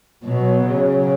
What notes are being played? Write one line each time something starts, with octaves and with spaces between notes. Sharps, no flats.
B2 F#3
C#3